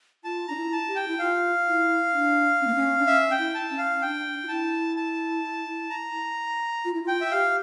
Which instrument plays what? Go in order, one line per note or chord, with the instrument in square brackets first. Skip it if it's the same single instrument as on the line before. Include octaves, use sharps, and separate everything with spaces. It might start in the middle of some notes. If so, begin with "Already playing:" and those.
[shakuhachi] F4 [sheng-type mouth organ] A5
[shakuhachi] D4 [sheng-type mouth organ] A#5
[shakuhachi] E4
[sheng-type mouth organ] A5
[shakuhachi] G4
[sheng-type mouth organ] G5
[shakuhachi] E4
[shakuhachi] F4 [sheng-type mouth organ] F5
[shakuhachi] E4
D4
C#4
A#3
C#4
D4
[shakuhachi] C#4 [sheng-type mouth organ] E5
[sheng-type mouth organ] G5
[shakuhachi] E4
[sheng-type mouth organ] A5
[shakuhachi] C#4
[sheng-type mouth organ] F5
[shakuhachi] D4 [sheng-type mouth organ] G5
[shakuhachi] F4
[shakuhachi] E4 [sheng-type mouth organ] A5
[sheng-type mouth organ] A5
A#5
[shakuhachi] F4
E4
F4
[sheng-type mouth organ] G5
E5
[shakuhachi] G4 [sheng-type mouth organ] F5